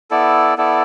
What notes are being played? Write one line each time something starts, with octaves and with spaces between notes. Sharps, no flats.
B3 E4 A4 D5
B3 E4 A4 D5